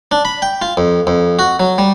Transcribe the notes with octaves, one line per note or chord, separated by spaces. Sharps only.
D4
B5
G5
F4
F2
F2
F#4
F#3
G3